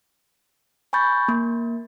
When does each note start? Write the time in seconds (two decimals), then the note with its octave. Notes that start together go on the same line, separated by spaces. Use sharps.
0.93 G#5 B5 C#6 G6 A6
1.28 A#3